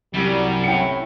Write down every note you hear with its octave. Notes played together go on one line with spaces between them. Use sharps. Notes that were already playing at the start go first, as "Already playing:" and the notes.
C2 F#2 G3
A2 G5 C#7